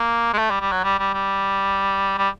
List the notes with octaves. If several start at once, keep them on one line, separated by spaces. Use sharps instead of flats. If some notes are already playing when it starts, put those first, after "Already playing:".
Already playing: A#3
G#3
A3
G3
G3
F#3
G3
G3
G3
G3